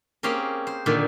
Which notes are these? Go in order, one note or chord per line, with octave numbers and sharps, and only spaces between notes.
A#3 C4 C#4 G4 G#4 A#4
C5
A#2 D3 D#3